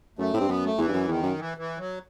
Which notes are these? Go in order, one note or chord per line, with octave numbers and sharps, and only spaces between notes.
F#2 A3
A2 C4
G2
F#2 B3
A3
E2 E3
G2
F#2
E2 D#3
F#2
E3
E3
F#3